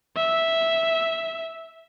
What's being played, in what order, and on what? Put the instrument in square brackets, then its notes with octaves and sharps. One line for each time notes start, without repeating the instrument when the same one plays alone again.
[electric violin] E5